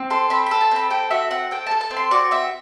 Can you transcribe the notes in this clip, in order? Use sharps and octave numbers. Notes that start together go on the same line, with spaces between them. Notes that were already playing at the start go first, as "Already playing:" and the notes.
Already playing: C4
A4 C6
C4 B5
A4 B5
A5
C4 B5
A4 G5
F#4 E5
C4 F#5
A4 G5
A4 A5
A5
C4
C6
F#4 D5
C4 E5